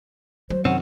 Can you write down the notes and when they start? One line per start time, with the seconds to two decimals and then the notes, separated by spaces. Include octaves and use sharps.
0.50 F#3 C5
0.65 F#2 C3 D#3 C4 C#4 F#5